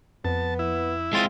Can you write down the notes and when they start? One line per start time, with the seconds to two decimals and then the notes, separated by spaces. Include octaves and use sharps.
0.25 F2 B3 A5
0.59 E4
1.13 G#3 C4 F4 D#6 A6 D#7